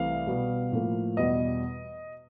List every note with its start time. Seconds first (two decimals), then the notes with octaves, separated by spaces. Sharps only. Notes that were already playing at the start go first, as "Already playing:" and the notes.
Already playing: C2 C3 E3 A3 F5
0.27 B2 G3 B3
0.72 A2 F3 A#3
1.17 E2 B2 G3 D#5